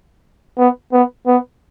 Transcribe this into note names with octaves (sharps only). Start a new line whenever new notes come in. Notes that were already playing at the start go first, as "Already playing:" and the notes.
B3
B3
B3